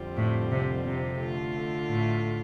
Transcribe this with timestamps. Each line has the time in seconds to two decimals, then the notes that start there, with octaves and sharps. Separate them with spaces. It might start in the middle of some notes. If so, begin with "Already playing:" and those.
Already playing: F2 D3 G3 C4 F4
0.17 A2
0.51 C3
0.86 C3
1.20 D3 A3 F4
1.88 A2